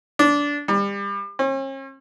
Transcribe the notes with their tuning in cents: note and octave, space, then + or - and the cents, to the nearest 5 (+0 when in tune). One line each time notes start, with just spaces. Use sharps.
D4 -20
G3 +30
C#4 -45